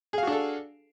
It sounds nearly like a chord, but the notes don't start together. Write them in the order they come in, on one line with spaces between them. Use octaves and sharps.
G#4 F5 F#4 D4 A4